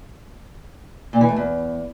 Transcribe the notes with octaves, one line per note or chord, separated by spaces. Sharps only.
A#2
E3
A3
E2